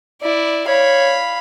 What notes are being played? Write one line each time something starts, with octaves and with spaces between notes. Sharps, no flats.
E4 D5
C#5 F5 B5